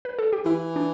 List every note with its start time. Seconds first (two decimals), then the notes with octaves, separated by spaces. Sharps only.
0.05 B4
0.19 A4
0.33 G4
0.46 E3 E4
0.76 D4